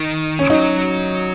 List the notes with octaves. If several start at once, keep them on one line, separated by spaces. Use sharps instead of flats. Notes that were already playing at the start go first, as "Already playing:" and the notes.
Already playing: D#3
C#4
F#3 D#4